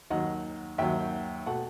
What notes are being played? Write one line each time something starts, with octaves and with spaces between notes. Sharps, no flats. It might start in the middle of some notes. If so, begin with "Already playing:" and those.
D#2 D#3 F#3 D#5 F#5
D#2 D#3 F#3 E5 G5
B2 A3 F#5 A5